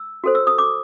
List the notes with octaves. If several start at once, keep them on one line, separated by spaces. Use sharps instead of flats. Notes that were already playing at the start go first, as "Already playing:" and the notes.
Already playing: E6
F#4 A4 C5
E6
D#6
D6